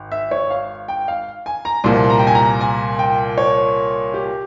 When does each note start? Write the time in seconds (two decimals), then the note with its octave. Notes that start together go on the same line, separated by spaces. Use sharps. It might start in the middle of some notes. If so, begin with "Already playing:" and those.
Already playing: G#1
0.12 E5
0.31 C#5
0.50 F5
0.88 G5
1.08 F5
1.46 G#5
1.65 A#5
1.84 C2 A#2 F3 C6
2.10 A#5
2.19 G5
2.27 G#5
2.35 A#5
2.61 G#5
2.99 G5
3.38 C#5
4.14 G4